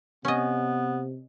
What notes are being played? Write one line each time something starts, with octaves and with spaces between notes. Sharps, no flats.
C3 B3 C#4 D#5